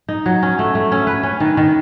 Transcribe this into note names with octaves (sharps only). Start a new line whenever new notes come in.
D#4
F#3
C#4
A3
A3
C#4
B4
C#4
D#3
D#3